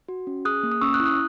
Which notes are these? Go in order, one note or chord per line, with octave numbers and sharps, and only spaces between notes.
F#4
C#4
G#4 D#6 F#6
A#3
D#6
C#4 C#6 E6
D#6 F#6
E4
D#6 F#6